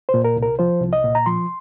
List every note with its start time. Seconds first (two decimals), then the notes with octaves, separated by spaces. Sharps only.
0.09 C5
0.14 A#2
0.24 A#4
0.37 C2
0.42 A#4
0.59 F3 C5
0.81 C2
0.93 D#5
1.04 A#2
1.15 A#5
1.26 F3 C6